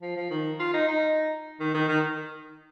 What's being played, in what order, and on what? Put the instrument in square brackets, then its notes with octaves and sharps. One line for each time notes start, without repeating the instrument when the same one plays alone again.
[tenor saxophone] F3
F3
D#3
F4
D#4
D#4
D#3
D#3
D#3